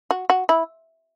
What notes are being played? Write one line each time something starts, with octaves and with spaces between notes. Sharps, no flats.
F#4
F#4
E4